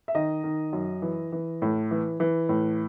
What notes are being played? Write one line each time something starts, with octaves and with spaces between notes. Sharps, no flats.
E5
D#3 D#5
D#3
F#2
E3
E3
A2
E3
E3
A2